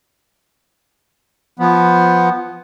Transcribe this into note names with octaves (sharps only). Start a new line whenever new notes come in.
F3 B3